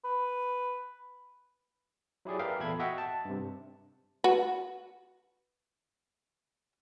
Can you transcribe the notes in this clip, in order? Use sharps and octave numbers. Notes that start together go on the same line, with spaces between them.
B4
F#3 E4 G4 G#4 D5
A#4 B4 E5 F5 G5
E2 A#2 A4 E5 B5 G#6
F#4 D#5 E5 F#5 G5
A5
G2 C3
F#4 B4